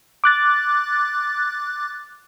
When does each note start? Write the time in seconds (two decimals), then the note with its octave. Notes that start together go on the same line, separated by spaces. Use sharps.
0.24 D6 F#6 A6